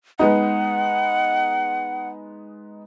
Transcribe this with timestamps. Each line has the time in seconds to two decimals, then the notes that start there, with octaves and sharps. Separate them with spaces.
0.19 G#3 B3 D#4 F#5